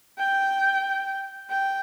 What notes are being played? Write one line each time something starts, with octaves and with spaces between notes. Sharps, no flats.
G5
G5